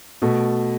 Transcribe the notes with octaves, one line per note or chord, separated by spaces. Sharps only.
B2 A3